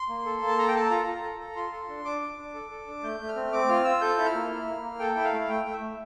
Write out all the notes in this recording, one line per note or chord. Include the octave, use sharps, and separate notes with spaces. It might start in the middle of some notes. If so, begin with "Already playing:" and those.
Already playing: C6
A#3
A4
A#3
A5
A4 A#5
G5
A4 A5
F4 A#5
F4
A4
A4
F4 C6
A4
D4
D4 D6
D4
D4
A4
A4
D4
A3 G6
A3
F6
C4
C4 D6
F4 F6
F4 E6
A4 G6
E4
F6
A#3
E4
A#3
A#3
A4 G5
E4
F5
A3
A3 G5
A3
E5
A3